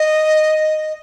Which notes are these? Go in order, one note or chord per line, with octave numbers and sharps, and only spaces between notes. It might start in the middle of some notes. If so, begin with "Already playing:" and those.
Already playing: D#5